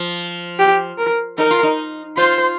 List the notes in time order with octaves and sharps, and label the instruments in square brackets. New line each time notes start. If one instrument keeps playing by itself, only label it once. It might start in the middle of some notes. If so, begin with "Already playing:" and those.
Already playing: [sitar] F3
[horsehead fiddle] G4
A#4
[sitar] D#4 [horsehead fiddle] A#4
[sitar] F4
D#4
[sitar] F4 [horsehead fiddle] C5